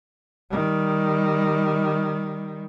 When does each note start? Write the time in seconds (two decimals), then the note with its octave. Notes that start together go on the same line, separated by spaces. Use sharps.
0.51 D#3 G3